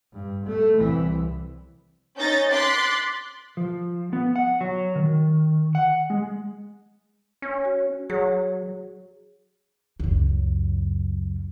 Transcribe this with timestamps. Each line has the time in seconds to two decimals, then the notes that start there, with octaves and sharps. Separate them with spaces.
0.13 G2
0.45 A3
0.76 C2 E3
2.18 C#4 D#4 G6 A6 A#6
2.49 C6 D6 F#6 A6 B6
3.57 F3
4.13 B3
4.36 F#5
4.61 F#3
4.96 D#3
5.75 F#5
6.10 G#3
7.42 C#4
7.65 F#4
8.10 F#3 G#4 C#5
10.00 C#2 F#2